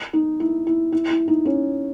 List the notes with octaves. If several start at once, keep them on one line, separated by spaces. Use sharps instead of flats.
D#4
E4
E4
E4
E4
D#4
C#4